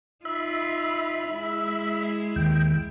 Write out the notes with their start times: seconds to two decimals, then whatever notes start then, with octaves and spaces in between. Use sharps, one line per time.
0.25 D#4 F4 E5 B5
1.31 G#3 E4
2.36 D#2 G5